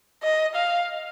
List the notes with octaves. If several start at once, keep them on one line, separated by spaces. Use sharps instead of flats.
D#5
F5